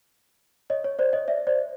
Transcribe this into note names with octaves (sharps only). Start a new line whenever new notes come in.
C#5 D#5
C#5
C5 D5
C#5 D#5
D5 E5
C5 D5